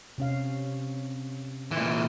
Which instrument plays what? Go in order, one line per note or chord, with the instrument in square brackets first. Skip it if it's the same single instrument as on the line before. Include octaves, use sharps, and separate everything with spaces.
[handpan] C3 C#4 F5
[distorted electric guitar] A#2 E3